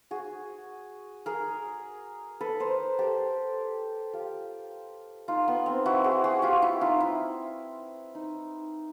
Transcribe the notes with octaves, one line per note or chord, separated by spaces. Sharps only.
F#4 G#4
G#4 A#4
A4 B4
A#4 C5
G4 A4
F4 G4
D#4 F4
B3
C4
E4 F#4
F#4 G#4
F#4 G#4
F4 G4
E4 F#4
D#4 F4
E4
D#4